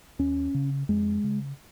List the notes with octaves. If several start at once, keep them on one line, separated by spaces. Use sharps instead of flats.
D#2 C#4
C#3
F2 G#3
C#3